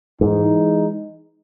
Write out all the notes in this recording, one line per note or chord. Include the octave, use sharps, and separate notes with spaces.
G#2 E3 G#3 D#4